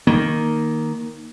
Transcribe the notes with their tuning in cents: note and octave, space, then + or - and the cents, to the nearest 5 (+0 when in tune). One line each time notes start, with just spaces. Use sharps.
D#3 +0 A#3 +0